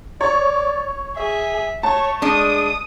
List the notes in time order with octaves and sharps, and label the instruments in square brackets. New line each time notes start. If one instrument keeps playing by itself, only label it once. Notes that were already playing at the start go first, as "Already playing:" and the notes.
[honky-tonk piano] C#5 [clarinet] D5
[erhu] G#4 [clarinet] E5
[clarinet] A3 [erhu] C#5 [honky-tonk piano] A5
[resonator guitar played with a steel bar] G#3 D4 [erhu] D#6